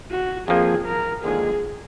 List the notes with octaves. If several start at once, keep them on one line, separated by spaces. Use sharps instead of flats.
F#4
F2 F3 A#3 G#4
A#4
D#2 D3 F3 G#3 G#4